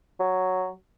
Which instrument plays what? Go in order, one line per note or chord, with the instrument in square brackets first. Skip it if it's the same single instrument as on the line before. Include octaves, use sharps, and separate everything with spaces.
[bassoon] F#3